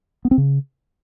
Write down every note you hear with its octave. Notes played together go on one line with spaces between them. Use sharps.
B3
C4
C#3